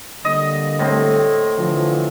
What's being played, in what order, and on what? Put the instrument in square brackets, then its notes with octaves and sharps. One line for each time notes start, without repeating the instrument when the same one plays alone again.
[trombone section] D3 G3 A#3 [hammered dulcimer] D#5
[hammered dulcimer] A2 C4
[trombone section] D3 E3 F3